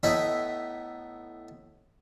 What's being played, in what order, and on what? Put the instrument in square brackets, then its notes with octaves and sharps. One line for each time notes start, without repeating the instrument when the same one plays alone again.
[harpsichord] A2 B3 D#4 E4 B5